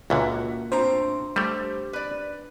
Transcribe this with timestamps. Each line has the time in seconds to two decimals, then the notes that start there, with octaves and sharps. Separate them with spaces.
0.10 C#2 A#2 D3 A#3 F4 F#4 A#4 E5
0.72 A2 C4 D4 C5 A#5
1.36 G3 A3 G4
1.93 B4 D5